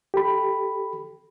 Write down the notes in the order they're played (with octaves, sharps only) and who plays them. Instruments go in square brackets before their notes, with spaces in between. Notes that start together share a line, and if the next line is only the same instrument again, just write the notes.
[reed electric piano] G4 A4 B5